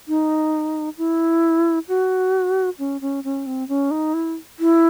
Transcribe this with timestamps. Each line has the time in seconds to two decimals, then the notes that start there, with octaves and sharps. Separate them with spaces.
0.08 D#4
0.98 E4
1.88 F#4
2.79 C#4
3.01 C#4
3.24 C#4
3.46 C4
3.68 C#4
3.91 D#4
4.14 E4
4.59 E4